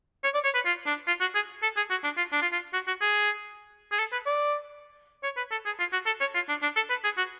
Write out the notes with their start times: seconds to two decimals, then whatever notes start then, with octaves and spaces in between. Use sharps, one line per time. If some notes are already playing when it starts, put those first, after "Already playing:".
0.24 C#5
0.34 D5
0.44 C#5
0.55 B4
0.66 F4
0.86 D4
1.07 F4
1.21 F#4
1.35 G#4
1.63 A4
1.77 G#4
1.91 F#4
2.04 D4
2.18 F4
2.32 D4
2.42 F4
2.53 F4
2.74 F#4
2.87 F#4
3.01 G#4
3.92 G#4
3.99 A4
4.12 B4
4.26 D5
5.24 C#5
5.37 B4
5.51 A4
5.66 G#4
5.79 F4
5.93 F#4
6.06 A4
6.21 C#5
6.35 F4
6.49 D4
6.62 D4
6.76 A4
6.90 B4
7.04 G#4
7.18 F#4